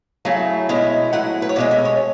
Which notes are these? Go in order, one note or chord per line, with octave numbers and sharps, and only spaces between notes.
C#3 F#3 A3 E4
B2 G#3 C#4 E4
F#3 A3 E4 F#5
B4
C#5
B2 G#3 C#4 D5
E5
C#5